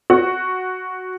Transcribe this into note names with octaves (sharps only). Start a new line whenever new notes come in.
F#4